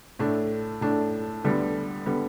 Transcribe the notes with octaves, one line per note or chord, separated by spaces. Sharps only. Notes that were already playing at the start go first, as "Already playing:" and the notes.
A2 A3 D4
A2 A3 D4
D2 D3 G3 B3
D3 G3 B3